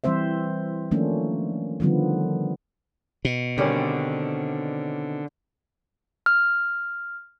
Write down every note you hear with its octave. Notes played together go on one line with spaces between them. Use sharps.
E3 G3 C4 C5 E5
D#3 F3 A3 A#3 C#4 D4
D3 D#3 F3 G3 B3
B2
D3 D#3 G3 C4 C#4
F6